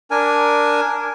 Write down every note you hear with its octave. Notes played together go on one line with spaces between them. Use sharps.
D4 A#4 G#5